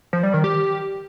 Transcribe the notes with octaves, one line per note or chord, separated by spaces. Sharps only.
F3
G3
D#3
G4